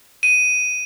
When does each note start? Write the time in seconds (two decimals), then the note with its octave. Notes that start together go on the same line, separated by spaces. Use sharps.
0.23 D#7